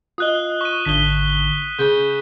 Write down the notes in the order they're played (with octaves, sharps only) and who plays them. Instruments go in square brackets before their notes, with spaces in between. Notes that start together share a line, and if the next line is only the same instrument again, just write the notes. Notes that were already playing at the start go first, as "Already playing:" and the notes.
[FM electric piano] F4 D#5 [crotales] D#6 F#6 G7
[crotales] C#6 D#7
[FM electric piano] G#1 D3 D#6 [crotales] B6 G7
[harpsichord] C#3 [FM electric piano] G6